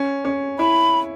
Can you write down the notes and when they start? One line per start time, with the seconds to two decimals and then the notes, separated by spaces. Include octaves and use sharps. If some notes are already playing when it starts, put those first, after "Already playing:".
Already playing: C#4
0.25 C#4
0.59 E4 B5